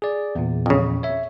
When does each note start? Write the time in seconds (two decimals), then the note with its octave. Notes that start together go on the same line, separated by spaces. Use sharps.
0.02 G#4 D5
0.35 E2 A#2
0.66 F2 C#3
1.03 C#5 E5